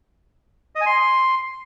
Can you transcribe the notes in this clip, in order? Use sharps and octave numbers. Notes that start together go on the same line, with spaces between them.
D#5
G#5
C6